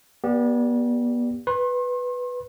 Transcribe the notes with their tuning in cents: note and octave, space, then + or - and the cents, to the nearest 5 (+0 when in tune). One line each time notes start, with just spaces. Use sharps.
B3 -35 G4 +0 D5 +0
B4 +0 C6 +40